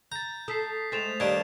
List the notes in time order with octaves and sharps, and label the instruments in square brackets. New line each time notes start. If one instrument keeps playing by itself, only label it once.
[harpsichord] A#5 [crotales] G6 A6
[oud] A4 [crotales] D#6 B6 C7
[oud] G#3 A3 C4 [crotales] A6 E7 F7
[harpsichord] D#2 G3 [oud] D4 [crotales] G#6 D7